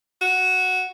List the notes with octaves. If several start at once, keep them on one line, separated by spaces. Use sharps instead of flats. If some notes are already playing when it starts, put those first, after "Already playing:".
F#4